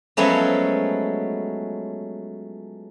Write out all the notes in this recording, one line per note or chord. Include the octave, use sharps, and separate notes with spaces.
F3 F#3 G#3 A3 B3 C#4